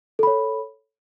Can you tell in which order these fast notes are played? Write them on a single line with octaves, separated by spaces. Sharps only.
A4 B5 C#5